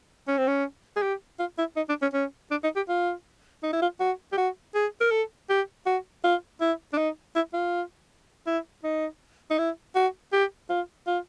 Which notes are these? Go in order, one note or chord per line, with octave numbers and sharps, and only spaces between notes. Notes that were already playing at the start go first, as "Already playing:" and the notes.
C#4
C4
C#4
G#4
G4
F4
E4
D#4
D4
C#4
C#4
D4
D#4
G4
F4
D#4
E4
F4
F#4
G4
F#4
G#4
A#4
A4
G4
F#4
F4
E4
D4
D#4
E4
F4
E4
D#4
D#4
E4
F#4
G4
F4
F4